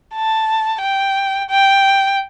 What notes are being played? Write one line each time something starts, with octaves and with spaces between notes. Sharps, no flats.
A5
G5
G5